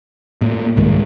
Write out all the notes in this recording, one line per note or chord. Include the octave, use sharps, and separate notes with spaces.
A2 A#3
C2 G#2 D#3